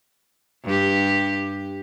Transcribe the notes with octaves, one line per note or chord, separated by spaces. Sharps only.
G2 G4